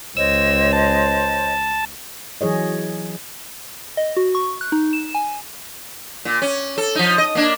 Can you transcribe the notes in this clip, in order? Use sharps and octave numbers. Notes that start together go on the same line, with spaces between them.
C#2 C5 C#5 D#5 E6
A5
E3 F#3 G#4 C#5 D#5
D#5
F#4
C#6
F#6
D#4
E7
G#5
A#2
C#4
A4
F3 D#4
D#5
A#3 D4